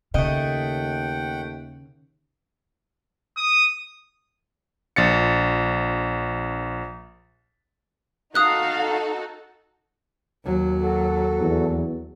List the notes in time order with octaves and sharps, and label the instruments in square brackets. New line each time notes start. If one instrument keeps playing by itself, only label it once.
[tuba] D#2 [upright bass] C#3 [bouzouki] A3 D#5 [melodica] F#5 G5
[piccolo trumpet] D#6
[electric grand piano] A#1 A6 C#7
[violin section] D#4 F#4 A4 [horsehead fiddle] F5 [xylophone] D#6 F#6
[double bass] D#2 F#3
[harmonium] F#4 A4
[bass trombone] E2